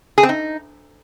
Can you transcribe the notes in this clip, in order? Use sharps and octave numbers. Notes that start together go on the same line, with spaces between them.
G#4
C4
D#4